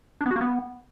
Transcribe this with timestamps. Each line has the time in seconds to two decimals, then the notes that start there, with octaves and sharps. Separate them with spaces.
0.21 D4
0.26 B3
0.31 F#4
0.36 A#3
0.41 B3